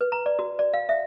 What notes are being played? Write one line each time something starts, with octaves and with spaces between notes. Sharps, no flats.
B4
A#5
D5
F#4
D5
F5
E5